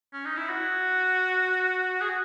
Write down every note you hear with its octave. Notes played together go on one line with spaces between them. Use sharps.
C#4
D#4
E4
F#4
G#4
F#4